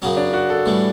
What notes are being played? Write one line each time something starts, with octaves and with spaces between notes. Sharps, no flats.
F#2 C#3 F#3 C#4
D4
F#4
A4
A2 E3 G3